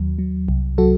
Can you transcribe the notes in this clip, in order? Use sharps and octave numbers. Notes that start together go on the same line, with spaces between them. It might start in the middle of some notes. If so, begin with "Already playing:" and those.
Already playing: D#2 F#3
F#3
C2
F#3 F#4 A4